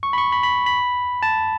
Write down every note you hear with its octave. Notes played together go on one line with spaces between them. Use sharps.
C#6
B5
C#6
B5
B5
B5
A5